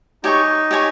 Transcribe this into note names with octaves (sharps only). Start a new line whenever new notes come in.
D#4 G4 C#5 G#5 C#6
G4 C#5 G#5 C#6